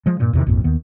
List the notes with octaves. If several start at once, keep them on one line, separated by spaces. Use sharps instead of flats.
F3 G#3
G2 A#2
E2 C3 D#3
A#1 F2 G#2
D#2 D#3 B3